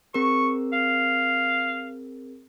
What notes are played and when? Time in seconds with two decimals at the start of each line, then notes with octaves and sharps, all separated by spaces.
0.14 C4 G#4 A#4 C#6
0.73 F5